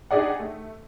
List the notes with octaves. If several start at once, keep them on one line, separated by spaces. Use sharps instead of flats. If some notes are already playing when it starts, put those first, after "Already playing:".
D4 D#4 G4 G#4 D5 F#5
A3